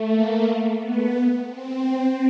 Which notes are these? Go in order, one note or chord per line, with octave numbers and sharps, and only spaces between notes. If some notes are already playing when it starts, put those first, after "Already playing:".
Already playing: A3
A#3
B3
C4